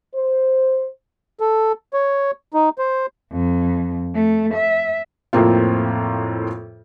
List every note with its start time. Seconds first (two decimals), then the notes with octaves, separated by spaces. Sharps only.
0.14 C5
1.40 A4
1.93 C#5
2.54 D#4
2.78 C5
3.32 F2
4.15 A3
4.54 E5
5.33 F2 A2 A#3 C4 F4